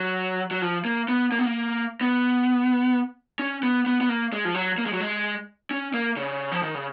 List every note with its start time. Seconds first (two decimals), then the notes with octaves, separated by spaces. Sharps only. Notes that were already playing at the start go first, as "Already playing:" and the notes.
Already playing: F#3
0.51 F#3
0.62 F3
0.85 A#3
1.09 B3
1.32 A#3
1.39 B3
1.46 A#3
2.01 B3
3.39 C#4
3.63 B3
3.86 B3
4.01 B3
4.09 A#3
4.33 G#3
4.45 F3
4.54 F#3
4.78 A#3
4.86 G#3
4.93 F#3
5.00 G#3
5.71 C#4
5.94 A#3
6.17 C#3
6.52 F3
6.63 D#3
6.75 C#3